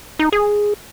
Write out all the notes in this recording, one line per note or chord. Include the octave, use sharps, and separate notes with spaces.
D#4
G#4